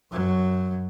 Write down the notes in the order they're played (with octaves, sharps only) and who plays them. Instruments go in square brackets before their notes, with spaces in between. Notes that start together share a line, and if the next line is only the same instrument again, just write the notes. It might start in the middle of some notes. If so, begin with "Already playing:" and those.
[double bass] F#2 F#3